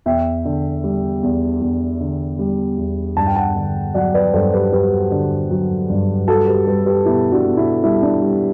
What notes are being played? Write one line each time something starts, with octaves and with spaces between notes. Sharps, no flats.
E2 E5 G5
D3
G3
E2
E2
D3
G3
E2
G2 A5
G5
F#5 A5
D3
F#3 D5 F#5
B4 D5
G2 A4 C5
G4 B4
G2 G4 B4
D3
F#3
G2
G3 F#4 A4
G4 B4
G3 G4 B4
G4 B4
B2 E4 G4
D4 F#4
B2
E4
G3 E4
D4
G3